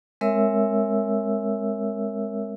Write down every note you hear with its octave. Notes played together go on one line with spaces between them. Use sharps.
G#3 C4 A#4 C#5 E5 E6